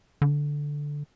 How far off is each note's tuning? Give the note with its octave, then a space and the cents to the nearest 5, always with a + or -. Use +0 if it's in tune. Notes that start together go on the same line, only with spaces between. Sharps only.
D3 -5